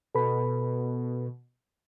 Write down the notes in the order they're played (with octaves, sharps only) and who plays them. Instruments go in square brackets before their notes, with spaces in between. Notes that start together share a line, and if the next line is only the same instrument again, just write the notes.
[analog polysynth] B2 [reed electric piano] A4 B4 B5